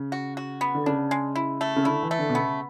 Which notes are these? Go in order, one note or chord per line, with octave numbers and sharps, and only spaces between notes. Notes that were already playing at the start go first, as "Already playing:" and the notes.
Already playing: C#3
F#4
F#4
B3
D3
C#3 D4
G#3
E4
A3
C#3
D3 E4
E3
A3
D3
B2
C#3 B3